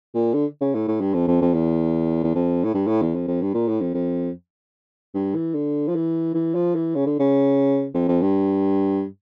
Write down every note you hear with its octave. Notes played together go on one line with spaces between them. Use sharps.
A#2
D3
C#3
A2
A2
G2
F2
F2
F2
E2
E2
F2
A2
G2
A2
E2
F2
F2
G2
A#2
A2
F2
F2
G2
E3
D3
F3
E3
E3
F3
E3
C#3
D3
C#3
F2
F2
G2